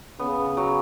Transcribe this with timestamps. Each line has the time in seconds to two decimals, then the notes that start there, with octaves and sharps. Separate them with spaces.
0.19 C#3 B3
0.57 F#3